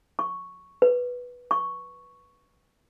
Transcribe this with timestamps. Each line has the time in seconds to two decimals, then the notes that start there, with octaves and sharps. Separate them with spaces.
0.19 C#6
0.82 B4
1.51 C#6